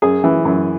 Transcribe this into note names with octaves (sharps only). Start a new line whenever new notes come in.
F#2 G#4
E3
F#2